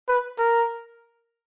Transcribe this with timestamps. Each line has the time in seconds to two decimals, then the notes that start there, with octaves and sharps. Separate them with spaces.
0.08 B4
0.38 A#4